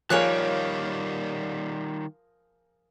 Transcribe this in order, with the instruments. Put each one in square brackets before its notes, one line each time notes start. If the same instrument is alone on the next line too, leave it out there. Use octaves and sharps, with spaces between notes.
[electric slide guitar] D#3 G3 [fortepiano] F3 G#4 A#4 [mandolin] A#3 C#5 F#6